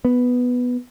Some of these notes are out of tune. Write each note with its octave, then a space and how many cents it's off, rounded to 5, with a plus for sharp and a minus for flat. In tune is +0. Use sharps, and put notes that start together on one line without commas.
B3 +0